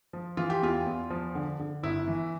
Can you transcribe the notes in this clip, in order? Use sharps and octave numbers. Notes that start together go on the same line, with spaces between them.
F3
E3 F4
G4
E2 F4
E2
F3
D3
D3
G1 E4
E3